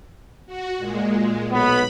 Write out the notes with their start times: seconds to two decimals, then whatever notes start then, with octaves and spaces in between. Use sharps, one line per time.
0.46 F#4
0.77 A#2 G#3
1.52 B1 B3 B5